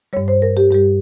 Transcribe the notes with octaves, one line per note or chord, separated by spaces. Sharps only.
G2 G3 C#5
C5
A#4
G4
G2 G3 G4